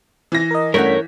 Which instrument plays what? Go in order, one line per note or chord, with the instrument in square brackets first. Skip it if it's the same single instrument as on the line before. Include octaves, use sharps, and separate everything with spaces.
[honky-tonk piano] E3 A#6
[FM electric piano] A#4 D#5
[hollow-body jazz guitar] G2 A3 C#4 [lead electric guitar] A#4 C#5 [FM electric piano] F#5 G6 B6